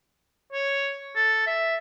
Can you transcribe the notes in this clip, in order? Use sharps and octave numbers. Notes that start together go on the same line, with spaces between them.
C#5
A4
E5